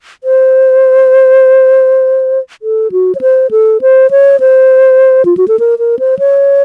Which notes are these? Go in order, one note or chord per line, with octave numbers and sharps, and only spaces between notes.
C5
A4
F#4
C#5
C5
A4
C5
C#5
C5
F4
F#4
A4
A#4
A#4
C5
C#5